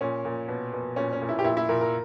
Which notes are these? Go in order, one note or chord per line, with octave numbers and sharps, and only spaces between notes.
A#2 C#4
A#2
B2
B2
A#2 C#4
C#4
A#2
E4
G4
A#2 E4
E4
A#2 A#4
A#4